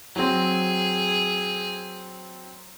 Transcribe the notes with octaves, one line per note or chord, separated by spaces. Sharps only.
F#3 C4 G#4